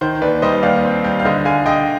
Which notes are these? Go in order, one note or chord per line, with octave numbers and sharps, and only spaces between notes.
D#3 C5
D#2 B4 D5
G3 C5 D#5
D#2 D5 F5
C4
G3
F5
D3 C5 D#5
D3 F5 G#5
D3 D#5 G5